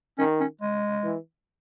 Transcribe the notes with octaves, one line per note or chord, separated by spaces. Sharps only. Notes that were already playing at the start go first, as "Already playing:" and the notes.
D#3 C#4
C#4
G#3
E3